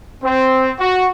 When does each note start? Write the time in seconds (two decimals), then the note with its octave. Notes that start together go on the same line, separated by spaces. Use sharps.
0.24 C4
0.79 F#4